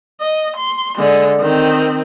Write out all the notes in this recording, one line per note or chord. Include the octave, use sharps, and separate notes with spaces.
D#5
C6
D3 G#3
D#3 C4